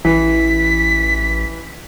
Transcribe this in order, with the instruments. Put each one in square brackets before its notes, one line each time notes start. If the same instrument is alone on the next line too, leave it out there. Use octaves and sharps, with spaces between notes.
[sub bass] A1 [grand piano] E3 [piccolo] B6